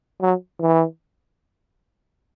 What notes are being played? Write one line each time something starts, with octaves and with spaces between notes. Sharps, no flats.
F#3
E3